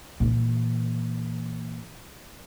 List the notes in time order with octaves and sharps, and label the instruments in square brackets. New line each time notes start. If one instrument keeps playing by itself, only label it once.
[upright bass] A#2 E3